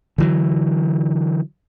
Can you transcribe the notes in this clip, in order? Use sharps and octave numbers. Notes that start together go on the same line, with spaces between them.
D3 E3 F#3